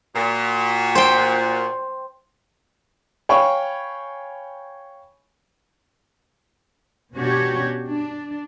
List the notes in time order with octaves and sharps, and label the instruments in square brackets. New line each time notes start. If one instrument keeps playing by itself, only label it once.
[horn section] A#2 F#4
[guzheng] C5 G5
[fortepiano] C#5 F5 G5 G#5 B5 C#6
[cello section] B2 C#4 D4 F#4 G4 C#5
D4